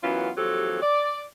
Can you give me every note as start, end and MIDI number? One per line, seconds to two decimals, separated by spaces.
0.03 0.29 42
0.03 0.29 52
0.03 0.29 54
0.03 0.29 59
0.03 0.29 61
0.03 0.29 65
0.37 0.79 39
0.37 0.79 53
0.37 0.79 54
0.37 0.79 60
0.37 0.79 67
0.37 0.79 69
0.82 1.21 74